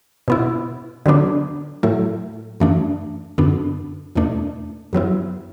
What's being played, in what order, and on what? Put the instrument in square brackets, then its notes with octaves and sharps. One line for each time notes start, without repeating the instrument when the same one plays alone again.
[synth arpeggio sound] B2 B3 E4
D3 F#3 B3 D4
A2 F#3 A3 E4
F#2 E3 A3 D4
F#2 D3 B3 D4
E2 B2 A3 D4
F#2 F#3 B3 E4